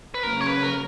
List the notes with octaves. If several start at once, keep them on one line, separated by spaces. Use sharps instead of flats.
B4
C#3 F#3 A#3 C#4 A#4
C#5
B4
A#4